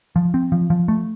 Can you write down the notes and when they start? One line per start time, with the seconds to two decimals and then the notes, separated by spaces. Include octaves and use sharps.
0.16 F3
0.34 C4
0.52 F3
0.70 F3
0.88 A3